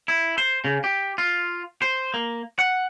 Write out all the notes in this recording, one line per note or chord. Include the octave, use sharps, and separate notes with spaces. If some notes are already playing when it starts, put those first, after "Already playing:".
E4
C5
C#3
G4
F4
C5
A#3
F#5